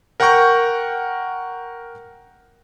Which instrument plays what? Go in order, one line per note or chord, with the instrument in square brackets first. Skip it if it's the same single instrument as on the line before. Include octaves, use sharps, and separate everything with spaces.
[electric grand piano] A#4 F#5 G5 A#5 C#6 G6